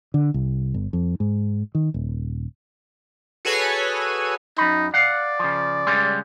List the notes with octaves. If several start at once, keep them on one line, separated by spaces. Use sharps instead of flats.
D3
C2
G1
F2
G#2
D#3
D#1
F#4 G#4 A4 B4 C#5 G#5
F#2 D#4 B5
D5 F5 F#5
C#3 F3
C#3 G3 G#3